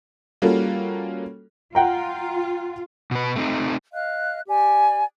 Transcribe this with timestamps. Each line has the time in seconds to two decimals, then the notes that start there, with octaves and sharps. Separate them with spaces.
0.42 G3 A#3 C#4 F4 F#4 A4
1.75 F4 F#5 G5 A#5
3.11 B2 B4
3.36 A3 C4 D#4
3.93 D#5 F5 F#6
4.47 G4 D5 G#5